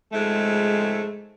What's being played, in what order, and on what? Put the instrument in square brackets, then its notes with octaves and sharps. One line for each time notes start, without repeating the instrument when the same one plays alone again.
[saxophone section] F2 G#2 A3 [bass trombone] G#3